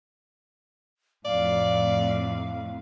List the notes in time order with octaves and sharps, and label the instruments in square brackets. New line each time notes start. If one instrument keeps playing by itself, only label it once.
[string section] F2 A2 [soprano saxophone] D5 [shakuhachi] F5